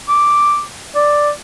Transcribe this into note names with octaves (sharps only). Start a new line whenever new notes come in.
D6
D5